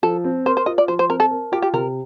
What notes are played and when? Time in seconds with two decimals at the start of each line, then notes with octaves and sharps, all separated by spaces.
0.03 F3 A4
0.24 C4
0.46 A#4 C5
0.57 C5
0.66 F4 D#5
0.78 D5
0.88 F3 C5
0.99 C5
1.09 C4 A#4
1.20 A4
1.31 A#4
1.52 F4 G4
1.62 G4
1.73 C3 A#4